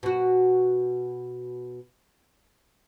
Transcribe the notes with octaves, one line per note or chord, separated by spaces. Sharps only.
B2 F#4